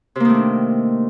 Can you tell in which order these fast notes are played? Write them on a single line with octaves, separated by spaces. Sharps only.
C3 A#3 D#3 A3 D4